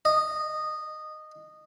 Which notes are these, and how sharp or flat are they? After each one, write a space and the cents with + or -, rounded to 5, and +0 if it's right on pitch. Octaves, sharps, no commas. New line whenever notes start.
D#5 -15